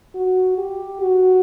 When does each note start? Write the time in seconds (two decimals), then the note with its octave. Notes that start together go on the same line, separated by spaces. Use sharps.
0.15 F#4
0.58 G4
1.01 F#4